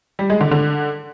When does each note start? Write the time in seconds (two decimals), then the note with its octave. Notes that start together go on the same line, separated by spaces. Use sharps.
0.19 G3
0.30 G#3
0.41 D3
0.51 D3